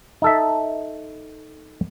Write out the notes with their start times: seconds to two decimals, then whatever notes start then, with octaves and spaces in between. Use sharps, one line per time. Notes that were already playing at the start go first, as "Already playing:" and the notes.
0.22 D#4 A4 E5